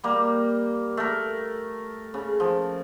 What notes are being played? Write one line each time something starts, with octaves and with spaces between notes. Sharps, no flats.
G3 A#3
A3 A#4
C#3
F3